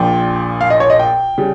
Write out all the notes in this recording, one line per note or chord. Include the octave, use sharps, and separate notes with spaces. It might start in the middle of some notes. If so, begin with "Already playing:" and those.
Already playing: A#1 A#2 F3 G5
F5
D#5
C#5
D#5
G5
C#3 G3